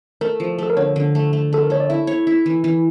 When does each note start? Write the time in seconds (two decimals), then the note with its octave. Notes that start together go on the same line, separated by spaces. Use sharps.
0.21 A3 A#4
0.40 F3
0.58 A3 A4
0.70 A#4
0.77 D3 C#5
0.96 D3
1.15 A3
1.33 A3
1.53 A3 A4
1.63 A#4
1.70 A3 C#5
1.80 D5
1.89 E4 E5
2.07 C#5
2.27 E4
2.46 E3
2.64 E3